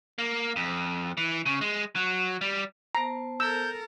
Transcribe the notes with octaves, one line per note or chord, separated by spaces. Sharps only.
A#3
F2
E3
C#3
G#3
F#3
G3
B3 C5 A5 A#5
A4 A#4 E6 G6